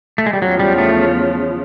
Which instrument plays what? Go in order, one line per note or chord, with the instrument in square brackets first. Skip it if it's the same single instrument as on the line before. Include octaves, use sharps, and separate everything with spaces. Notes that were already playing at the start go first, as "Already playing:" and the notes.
[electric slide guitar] A3
G#3
G3
[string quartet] E2 C#3 F3 [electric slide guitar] F#3
[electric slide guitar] G3
A3